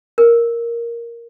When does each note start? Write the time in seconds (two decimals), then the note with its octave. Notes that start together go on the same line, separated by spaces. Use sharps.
0.18 A#4